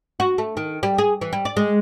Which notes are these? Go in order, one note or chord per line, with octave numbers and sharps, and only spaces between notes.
F#4
A3
D#3
G3
G#4
E3
G3
D5
G#3